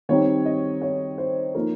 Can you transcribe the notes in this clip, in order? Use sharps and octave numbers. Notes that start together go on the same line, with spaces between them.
D#3 G3 C4 D#4 C#5
D#5
C#5
C5
F3 A#3 D#4 A#4